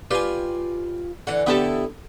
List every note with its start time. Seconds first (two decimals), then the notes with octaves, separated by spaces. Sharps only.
0.11 F4 G4 B4 D5 G#5
1.27 D3 E3 F#5
1.47 D3 B3 E4 G4 A4